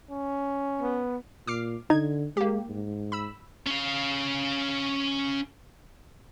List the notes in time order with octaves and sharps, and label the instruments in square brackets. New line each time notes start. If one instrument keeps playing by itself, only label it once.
[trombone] C#4
[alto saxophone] B3
[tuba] A#2 [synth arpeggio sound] D6 F6 C7
[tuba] D3 [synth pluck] D#4 [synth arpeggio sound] G#6
[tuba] G#3 [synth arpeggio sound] A#3 G4
[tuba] G#2
[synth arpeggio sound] B5 E6
[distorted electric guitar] C#4 F5